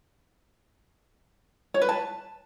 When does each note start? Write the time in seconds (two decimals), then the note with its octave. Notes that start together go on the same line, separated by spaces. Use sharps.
1.74 C#5
1.82 B4
1.89 A5